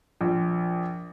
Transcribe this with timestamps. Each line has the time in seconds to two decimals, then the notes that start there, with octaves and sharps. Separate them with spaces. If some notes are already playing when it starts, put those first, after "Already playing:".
0.21 A#1